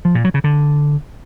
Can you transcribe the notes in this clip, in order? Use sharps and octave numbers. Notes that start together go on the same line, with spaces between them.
F3
A#2
F#3
C#3
D3